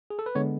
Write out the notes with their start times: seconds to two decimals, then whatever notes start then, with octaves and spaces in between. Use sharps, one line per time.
0.10 G#4
0.19 A4
0.26 B4
0.35 D3 G#3 B3 C#5